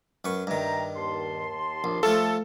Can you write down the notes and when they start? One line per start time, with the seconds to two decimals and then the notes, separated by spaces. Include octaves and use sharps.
0.25 F#2 B4 C#6
0.47 G2 D#3 E5 G5 A#5
0.96 D#2 A5 C6
1.84 A#1
2.03 F3 A3 F4 A4